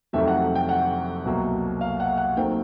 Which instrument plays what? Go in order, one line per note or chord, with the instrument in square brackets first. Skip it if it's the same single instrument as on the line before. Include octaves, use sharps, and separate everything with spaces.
[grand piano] F2 C3 D#3 F#3 A3 E5
F#5
G5
F#5
C2 B2 F#3 A#3
F5
F#5
F#5
D#2 D#3 F#3 A3 C4 G5